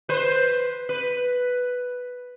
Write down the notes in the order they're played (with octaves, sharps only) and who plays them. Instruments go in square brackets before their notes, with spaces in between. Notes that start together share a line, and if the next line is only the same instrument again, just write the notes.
[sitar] B4 C5
B4